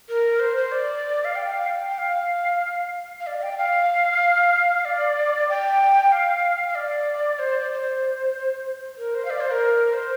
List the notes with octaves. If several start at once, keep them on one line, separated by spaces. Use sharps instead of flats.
A#4
C5
C5
D5
F5
G5
F5
G5
G5
F5
F5
D5
G5
F5
D5
G5
F5
F5
D5
C5
D5
C5
A#4
C5
F5
D5
C5
A#4
C5